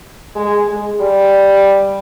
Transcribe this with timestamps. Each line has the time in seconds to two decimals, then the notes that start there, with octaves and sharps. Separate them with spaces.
0.36 G#3
0.68 G#3
1.01 G3